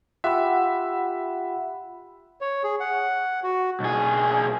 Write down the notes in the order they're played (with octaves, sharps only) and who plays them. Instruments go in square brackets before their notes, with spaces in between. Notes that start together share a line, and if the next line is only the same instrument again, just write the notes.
[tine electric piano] F4 G4 [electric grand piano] E5 E6 [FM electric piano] F#5 B5
[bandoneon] C#5
G#4
F#5
F#4
[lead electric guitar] B1 G#4